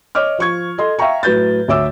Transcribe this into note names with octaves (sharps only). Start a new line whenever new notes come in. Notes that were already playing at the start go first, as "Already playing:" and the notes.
C#5 D#5 D6 F6
F3 C#6 G#6
A4 D#5 C6
E5 F5 G5 A#5 C#6
A2 F#3 B4 G6 A6
D2 C#5 E5 D6 E6